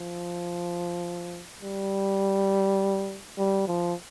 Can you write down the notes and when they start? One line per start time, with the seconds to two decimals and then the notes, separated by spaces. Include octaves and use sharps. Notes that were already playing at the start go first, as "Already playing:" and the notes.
Already playing: F3
1.62 G3
3.38 G3
3.68 F3